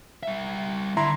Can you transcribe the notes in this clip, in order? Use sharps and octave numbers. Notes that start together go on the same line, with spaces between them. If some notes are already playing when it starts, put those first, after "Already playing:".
G3 E5
D3 E4 A#5 C6